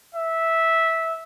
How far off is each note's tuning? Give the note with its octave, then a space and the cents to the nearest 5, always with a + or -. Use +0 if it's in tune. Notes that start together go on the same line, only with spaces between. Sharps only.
E5 -10